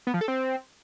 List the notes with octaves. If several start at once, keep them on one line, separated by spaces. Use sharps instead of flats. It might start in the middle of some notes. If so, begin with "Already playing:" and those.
B3
F3
A4
C4